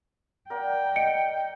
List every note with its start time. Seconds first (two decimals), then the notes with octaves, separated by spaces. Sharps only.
0.50 A#4 D5 F#5 G5
0.96 D#5 C#7 D7